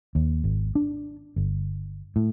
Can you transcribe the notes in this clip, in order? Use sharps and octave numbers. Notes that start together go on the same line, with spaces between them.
D#2
G#1
D4
G1
A2